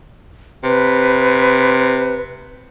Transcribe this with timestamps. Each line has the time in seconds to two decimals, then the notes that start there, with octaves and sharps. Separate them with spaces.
0.64 C3 B4